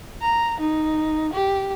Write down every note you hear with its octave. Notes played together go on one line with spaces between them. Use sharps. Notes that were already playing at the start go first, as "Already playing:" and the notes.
A#5
D#4
G4